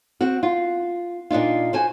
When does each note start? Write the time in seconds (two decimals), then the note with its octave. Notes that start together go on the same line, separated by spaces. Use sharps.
0.21 C4 F#4
0.43 F4
1.30 A#2 D4 D#4 F4
1.73 F#4 C5 G#5